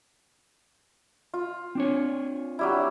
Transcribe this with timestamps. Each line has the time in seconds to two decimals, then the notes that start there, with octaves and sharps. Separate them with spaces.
1.34 F4
1.75 C4 D4 C#5
2.59 F#3 G3 E4